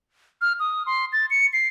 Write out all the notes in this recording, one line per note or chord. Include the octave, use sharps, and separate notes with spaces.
F6
D#6
C6
A6
C#7
C7